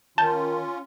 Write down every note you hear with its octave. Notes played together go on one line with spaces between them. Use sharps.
D#3 C#4 F4 A5 G6